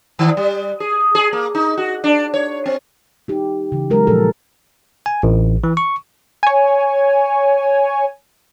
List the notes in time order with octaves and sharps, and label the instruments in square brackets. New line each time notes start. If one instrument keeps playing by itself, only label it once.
[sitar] D#3
G3
G#4
G#4
A#3
D#4
F#4
D4
C#5
C4
[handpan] D#4 G4
C#3 E3
F#3 G#3 A#4
A#2 F3 A4
[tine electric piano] G#5
A1
E3
C#6
[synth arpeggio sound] C#5 G#5